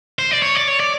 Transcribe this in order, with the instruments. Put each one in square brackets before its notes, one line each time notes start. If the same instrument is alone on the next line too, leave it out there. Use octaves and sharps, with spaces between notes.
[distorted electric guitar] C5
D5
C#5
D5
C#5
D5